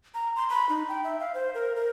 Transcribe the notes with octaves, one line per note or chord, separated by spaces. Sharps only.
A#5
C6
B5
D#4
G5
E5
F5
C5
A#4
A#4